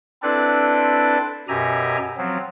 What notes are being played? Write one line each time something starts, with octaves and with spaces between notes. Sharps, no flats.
C4 D4 E4 A4 B4 D5
F#2 B2 G4 E5 G#5 A#5
F3 F#3 C4